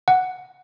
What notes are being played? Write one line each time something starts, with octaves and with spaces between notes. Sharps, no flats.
F#5